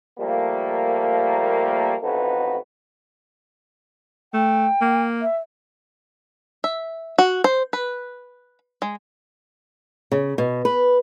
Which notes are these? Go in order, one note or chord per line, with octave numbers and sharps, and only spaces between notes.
F3 G3 A3 A#3
A1 F2 D#4 F#4 A4 B4
A3 G5
A#3
E5
E5
F#4
C5
B4
G#3
C#3
B2
B4